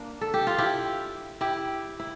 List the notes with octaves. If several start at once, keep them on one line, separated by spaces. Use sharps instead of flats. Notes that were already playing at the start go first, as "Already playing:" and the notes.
Already playing: A#3 D4
A4
G4
F4
E4 G4
E4 G4
E4